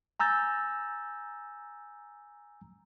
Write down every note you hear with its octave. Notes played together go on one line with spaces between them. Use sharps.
G#5 A#5 E6 G6 A6